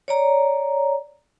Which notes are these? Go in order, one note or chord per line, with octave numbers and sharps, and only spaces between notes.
C#5 D5 A#5